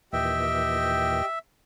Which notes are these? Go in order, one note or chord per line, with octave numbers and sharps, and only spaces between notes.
D#2 A#2 E3 G4 D#5 E5 G5